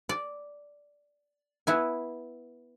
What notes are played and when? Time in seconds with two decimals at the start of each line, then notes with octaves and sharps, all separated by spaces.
0.09 D5
1.67 B3 E4 G#5